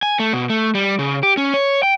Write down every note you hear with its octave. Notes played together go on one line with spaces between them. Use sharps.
G#5
A3
B2
A3
G3
C#3
G4
C#4
C#5
G5